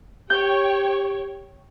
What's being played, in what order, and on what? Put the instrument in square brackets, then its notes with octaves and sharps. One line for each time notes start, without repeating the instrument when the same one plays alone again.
[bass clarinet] G4 [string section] C#5 G5 [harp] G6